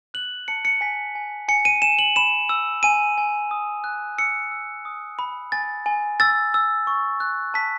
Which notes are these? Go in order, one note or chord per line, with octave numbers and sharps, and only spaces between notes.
F#6 F#7
A5 C#7
C#7
G#5 B6
G#5
G#5 C#7
D#7
G#5 E7
F#7
B5 E7
E6
G#5 D#7
G#5
D#6
F#6
E6 C#7
E6
D#6
B5
G#5 A6
G#5
E6 A6
E6
C#6
F#6
A5 B6